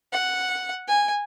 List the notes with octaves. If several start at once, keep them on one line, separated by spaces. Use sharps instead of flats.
F#5
G#5